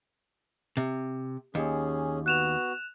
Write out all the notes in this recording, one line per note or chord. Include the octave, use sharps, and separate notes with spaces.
C3
D#2 C#4 G#4
B3 F#4 F#6 E7 F7